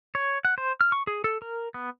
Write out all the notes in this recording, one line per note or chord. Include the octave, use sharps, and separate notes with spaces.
C#5
F#5
C5
F6
C#6
G#4
A4
A#4
B3